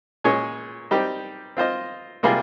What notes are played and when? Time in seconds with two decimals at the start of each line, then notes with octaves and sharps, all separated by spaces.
0.24 A#2 G#3 C#4 G#4 C#5
0.91 G3 C4 D#4 G4
1.57 C4 F4 C5 D#5
2.23 C3 G3 A#3 F4 G#4